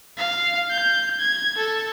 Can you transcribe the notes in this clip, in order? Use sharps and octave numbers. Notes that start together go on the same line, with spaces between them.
F5
G6
G#6
A4